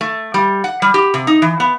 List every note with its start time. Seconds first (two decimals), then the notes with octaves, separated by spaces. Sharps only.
0.01 A3
0.34 G3
0.64 F#5
0.82 G3
0.94 G4
1.14 C3
1.27 D#4
1.42 E3
1.60 B3